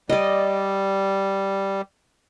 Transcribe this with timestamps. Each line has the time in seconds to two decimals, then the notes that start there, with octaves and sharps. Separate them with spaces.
0.10 G3 D5 D#5